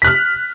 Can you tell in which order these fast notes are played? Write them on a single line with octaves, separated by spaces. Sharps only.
B6 F#6 F6